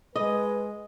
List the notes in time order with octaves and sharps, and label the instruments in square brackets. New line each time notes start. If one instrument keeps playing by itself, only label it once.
[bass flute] G#3 [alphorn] B4 [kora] D#5